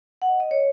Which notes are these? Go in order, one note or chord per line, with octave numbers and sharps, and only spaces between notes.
F#5
D#5
D#5
C#5